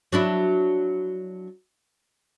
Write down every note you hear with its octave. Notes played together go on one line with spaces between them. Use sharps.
F#3 D4 E4